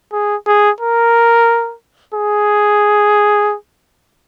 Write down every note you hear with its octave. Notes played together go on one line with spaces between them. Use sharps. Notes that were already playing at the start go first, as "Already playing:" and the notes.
G#4
G#4
A#4
G#4